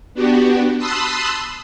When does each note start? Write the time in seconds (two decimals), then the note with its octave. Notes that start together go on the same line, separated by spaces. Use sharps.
0.14 B3 D4 F#4 G4
0.78 A5 B5 C6 D#6 E6 F#6